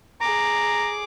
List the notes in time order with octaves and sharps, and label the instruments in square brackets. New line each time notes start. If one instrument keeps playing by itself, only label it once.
[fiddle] G#4 D6 [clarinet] A#5